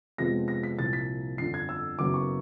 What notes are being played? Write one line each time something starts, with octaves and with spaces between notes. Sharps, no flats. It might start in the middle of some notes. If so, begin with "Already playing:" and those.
F2 C3 F3 G#3 B3 A#6
A#6
B6
C2 A#2 F3 A6
B6
G1 F2 D3 C7
G#6
E6
F#1 F#2 C#3 F#3 B3 D6
C#6